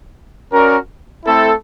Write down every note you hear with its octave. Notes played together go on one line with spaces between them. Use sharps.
C#4 F#4 A#4 D5
A3 C4 E4 A4